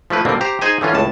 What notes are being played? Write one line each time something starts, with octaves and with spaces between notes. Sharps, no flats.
F3 A3 E4 B4
B2 D3 G3 A#3 C4
G4 C5 A#5
D#4 G#4 C5 G#5
D3 E3 C#4 F4
C#2 A2 A5